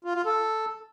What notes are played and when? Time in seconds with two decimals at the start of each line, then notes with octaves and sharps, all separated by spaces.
0.04 F4
0.15 F4
0.25 A4